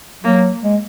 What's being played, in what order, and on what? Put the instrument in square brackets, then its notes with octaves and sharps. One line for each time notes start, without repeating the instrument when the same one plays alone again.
[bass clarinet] F#3 [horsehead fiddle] A#3
[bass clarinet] G#3